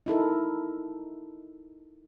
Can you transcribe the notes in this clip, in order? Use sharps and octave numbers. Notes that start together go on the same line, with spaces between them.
D#4 E4 A4 A#4